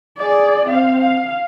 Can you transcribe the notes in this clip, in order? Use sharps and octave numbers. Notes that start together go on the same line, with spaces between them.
G#4 D5
C4 F5
F5